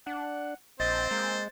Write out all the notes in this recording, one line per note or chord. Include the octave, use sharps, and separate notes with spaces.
D4 F#5
A#1 C4 C5 D#5 A6
G#3 A#3